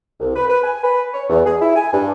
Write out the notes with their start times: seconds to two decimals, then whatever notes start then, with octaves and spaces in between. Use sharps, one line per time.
0.20 C2
0.35 B4
0.49 B4
0.64 G#5
0.84 B4
1.14 C#5
1.29 E2
1.46 G#4
1.61 E4
1.76 G#5
1.93 G2